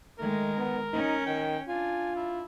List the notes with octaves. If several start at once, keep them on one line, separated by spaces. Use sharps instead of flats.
D#3 G#3 A3 A#4
B3
C#4 D#4
D#3 G5
D4 F4 G#5
E4